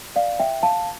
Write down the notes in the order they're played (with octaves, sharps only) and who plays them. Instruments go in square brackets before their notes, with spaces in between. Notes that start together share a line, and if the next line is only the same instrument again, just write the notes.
[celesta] D5 F5
E5 G5
F5 A5